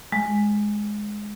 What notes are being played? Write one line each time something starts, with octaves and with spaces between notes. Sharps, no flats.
G#3